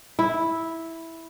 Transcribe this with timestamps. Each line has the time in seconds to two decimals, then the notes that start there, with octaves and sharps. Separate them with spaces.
0.19 E4